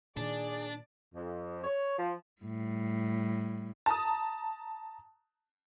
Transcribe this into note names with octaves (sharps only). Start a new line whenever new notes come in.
A#2 D#3 D4 G#4 D5
F2
C#5
F3
A2 G3
A5 A#5 D#6